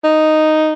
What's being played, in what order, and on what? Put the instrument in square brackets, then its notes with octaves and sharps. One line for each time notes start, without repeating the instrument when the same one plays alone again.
[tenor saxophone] D#4